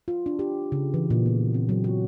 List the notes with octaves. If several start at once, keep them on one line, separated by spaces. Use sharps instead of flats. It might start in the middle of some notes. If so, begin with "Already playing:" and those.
F4
D4
G4
C#3
E3
A#2
B3
C4
F#3
F#4